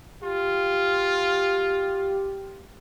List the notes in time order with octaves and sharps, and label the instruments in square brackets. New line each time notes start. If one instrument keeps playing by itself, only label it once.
[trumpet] F4 [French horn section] G4